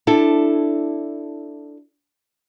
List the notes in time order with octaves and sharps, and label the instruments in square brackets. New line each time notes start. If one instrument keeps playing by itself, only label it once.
[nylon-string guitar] D4 E4 A4